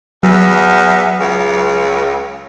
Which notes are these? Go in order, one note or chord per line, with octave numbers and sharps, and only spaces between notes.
E2 F#3
C#2